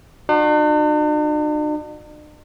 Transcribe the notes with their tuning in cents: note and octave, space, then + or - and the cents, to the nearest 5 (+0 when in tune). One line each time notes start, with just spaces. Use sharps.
D4 +45 F#4 -35